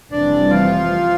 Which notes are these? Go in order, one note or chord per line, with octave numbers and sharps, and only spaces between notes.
F1 F2 E3 G3 C4 D4 D5
F3 F4